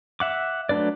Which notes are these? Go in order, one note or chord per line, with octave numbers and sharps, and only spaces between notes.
E5 F#5 D6
F#3 A3 D4 B4 D5